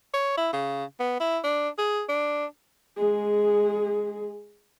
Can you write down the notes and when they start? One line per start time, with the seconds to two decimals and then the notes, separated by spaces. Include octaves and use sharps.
0.14 C#5
0.37 E4
0.53 C#3
0.99 B3
1.20 E4
1.44 D4
1.78 G#4
2.09 D4
2.97 G#3 G#4